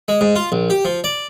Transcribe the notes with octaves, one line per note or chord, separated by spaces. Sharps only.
G#3
G#2
F4
A#1
G4
F3
D5